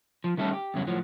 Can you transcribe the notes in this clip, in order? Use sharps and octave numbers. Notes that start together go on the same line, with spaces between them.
F3
D#3 G3 A3 C#4 A4
G4
E2 G2 C#3 F#3
A2 F3 F#3